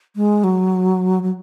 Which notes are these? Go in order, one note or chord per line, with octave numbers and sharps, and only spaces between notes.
G#3
F#3
F#3